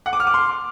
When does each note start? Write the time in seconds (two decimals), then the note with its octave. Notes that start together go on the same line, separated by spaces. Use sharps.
0.06 F#5
0.13 D6
0.20 F6
0.27 D6
0.34 C6